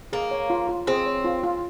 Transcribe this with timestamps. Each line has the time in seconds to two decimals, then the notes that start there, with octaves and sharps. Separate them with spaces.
0.13 A#3 G#4
0.31 C#5
0.50 F4
0.69 F4
0.87 C4 G#4
1.06 C#5
1.25 F4
1.43 F4